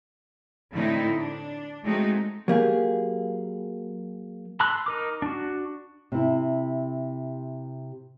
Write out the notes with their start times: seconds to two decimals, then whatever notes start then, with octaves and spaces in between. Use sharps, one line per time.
0.72 A2 D3 C4 D#4 E4
1.18 D4
1.83 G#3 A3 C4 D#4 F#4
2.48 F#3 A#3 G4 G#4
4.60 A5 B5 C6 E6 F#6
4.86 D#4 A#4 D6
5.22 D4 F#4
6.12 C3 E4